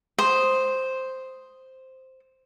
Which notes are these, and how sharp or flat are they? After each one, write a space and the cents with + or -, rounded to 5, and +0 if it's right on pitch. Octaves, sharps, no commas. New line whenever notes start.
C5 +0 D#6 +0